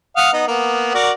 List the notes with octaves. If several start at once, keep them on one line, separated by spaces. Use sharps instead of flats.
F5 F#5 D#6
B3 D#4
A#3 B3
F#4 A#4 D5